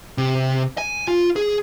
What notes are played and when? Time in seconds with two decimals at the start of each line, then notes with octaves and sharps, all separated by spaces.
0.18 C3
0.78 G#5
1.08 F4
1.36 G#4